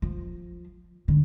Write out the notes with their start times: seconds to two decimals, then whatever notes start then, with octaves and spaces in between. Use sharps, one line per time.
0.02 F3
1.08 D3